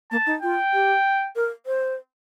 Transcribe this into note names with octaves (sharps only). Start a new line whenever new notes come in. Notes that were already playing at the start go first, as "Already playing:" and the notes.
A#3 A5
D#4
F4 G5
G4
A#4
C5